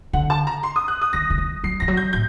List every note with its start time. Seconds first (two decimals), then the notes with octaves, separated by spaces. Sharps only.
0.13 D3 F#5
0.30 A5
0.47 A#5
0.63 C6
0.76 D#6
0.88 F#6
1.01 D#6
1.13 D#3 A#6
1.30 D3
1.38 D#3
1.64 F#3 C7
1.80 D#3 A#6
1.88 F#3
1.97 G6
2.13 A2 G6